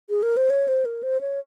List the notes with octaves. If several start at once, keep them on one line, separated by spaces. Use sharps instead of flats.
G#4
A#4
C5
C#5
C5
A#4
C5
C#5